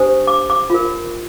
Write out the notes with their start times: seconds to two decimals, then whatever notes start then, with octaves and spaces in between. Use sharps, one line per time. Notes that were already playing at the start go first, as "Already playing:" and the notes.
Already playing: D4 G4 C5 D#6
0.27 D6
0.50 D6
0.70 F4 A#4